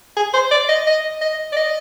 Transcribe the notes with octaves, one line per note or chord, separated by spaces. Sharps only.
G#4
C5
D5
D#5
D#5
D#5
D5
D#5